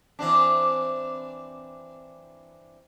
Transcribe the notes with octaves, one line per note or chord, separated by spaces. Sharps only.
E3 C4 D4